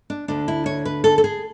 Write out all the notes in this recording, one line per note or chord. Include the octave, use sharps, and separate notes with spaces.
D4
D2 D3 D4
E4
C#5
B4
A4
A4
G#4